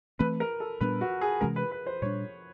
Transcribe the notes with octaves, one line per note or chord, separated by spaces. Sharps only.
E3 A3 C4 B4
A#4
A4
A#2 G3 B3 D4 B4
F#4
G#4
C3 E3 G#3 C#4 A#4
B4
B4
C5
A#2 G3 B3 D4 C#5